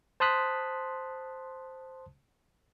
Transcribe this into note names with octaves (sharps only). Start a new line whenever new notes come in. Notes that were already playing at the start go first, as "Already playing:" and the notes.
C5 A5 C6 D#6 F#6 B6